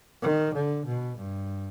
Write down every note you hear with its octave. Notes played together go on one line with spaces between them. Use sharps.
D#3
D3
B2
G2